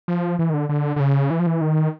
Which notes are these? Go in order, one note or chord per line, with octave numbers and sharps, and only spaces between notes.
F3
E3
D#3
D3
D3
D3
C#3
E3
F3
E3
D#3